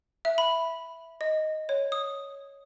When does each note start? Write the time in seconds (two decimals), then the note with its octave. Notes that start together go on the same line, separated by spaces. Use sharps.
0.25 E5
0.38 B5
1.21 D#5
1.69 C#5
1.92 D#6